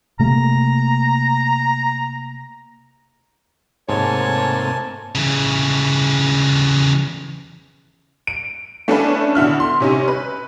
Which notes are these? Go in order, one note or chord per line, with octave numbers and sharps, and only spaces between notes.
C3 A3 A#3 A#5
G#2 C3 A3 A#3 C#5 G#5 A5
C#3 E3
D7
A3 C#4 D4 E4 A4 B4
B2 D3 E4 F6
C6
C3 C#4 D#4
B4